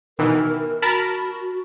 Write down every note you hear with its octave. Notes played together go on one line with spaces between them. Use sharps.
B2 D#3 E3 A#4
F#4 A#4 A5 B5